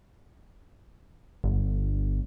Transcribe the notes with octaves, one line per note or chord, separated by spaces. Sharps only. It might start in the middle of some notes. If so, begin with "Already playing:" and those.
G1